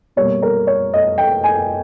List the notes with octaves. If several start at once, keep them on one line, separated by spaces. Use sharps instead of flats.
B2 G3 A#3 C#5
A#4
C#5
D#5
G5
G#5